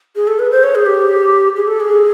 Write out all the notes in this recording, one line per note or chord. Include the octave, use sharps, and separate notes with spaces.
G#4
A4
B4
C5
C#5
G#4
G4
G#4
A4
G#4